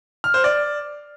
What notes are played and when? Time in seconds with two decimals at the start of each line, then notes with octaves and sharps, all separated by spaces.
0.24 F6
0.34 C5
0.44 D5